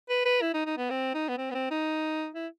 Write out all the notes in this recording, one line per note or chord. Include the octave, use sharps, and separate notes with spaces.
B4
B4
E4
D#4
D#4
B3
C4
D#4
B3
C4
B3
C4
D#4
E4